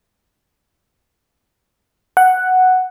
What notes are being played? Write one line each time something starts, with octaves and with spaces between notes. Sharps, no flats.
F#5